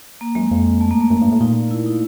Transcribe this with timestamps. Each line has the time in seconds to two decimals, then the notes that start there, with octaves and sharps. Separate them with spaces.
0.21 A#3
0.35 F#2 G#3
0.51 F2
0.81 A3
0.91 A#3
1.01 A3
1.10 F#2
1.21 G2
1.32 A2
1.40 A#2 D#4
1.71 E4
1.86 D#4